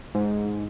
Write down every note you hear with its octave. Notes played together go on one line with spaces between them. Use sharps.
G#2